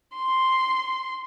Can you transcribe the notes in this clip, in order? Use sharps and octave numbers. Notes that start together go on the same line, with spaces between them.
C6